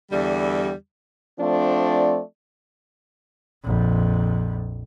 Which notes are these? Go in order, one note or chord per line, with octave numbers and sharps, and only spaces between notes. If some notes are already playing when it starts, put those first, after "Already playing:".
E2 D3 G3
F3 A3 C4 D4 D5
A#1 F2